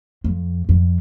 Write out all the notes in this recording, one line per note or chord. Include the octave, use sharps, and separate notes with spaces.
F2
F2